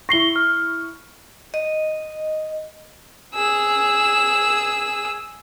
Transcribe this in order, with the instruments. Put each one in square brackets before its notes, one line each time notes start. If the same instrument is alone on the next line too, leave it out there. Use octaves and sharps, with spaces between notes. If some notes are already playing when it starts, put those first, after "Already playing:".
[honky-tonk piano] E4 C#6 [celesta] A#6 C7 G7
[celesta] F6
[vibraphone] D#5
[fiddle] G#4 E6